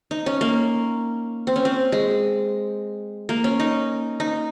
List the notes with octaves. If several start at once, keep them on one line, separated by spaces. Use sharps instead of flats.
D#4
C#4
A#3
C4
C#4
C4
G#3
A#3
C#4
D#4
D#4